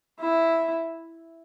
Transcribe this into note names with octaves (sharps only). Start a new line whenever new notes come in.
E4